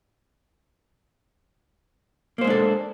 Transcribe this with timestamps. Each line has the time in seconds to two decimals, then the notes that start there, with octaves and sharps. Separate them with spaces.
2.38 A#3
2.41 C5
2.44 G#3
2.47 D4
2.50 A4